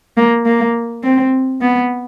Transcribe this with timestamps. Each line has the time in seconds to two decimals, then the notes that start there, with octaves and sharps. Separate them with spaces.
0.17 A#3
0.46 A#3
1.03 C4
1.61 B3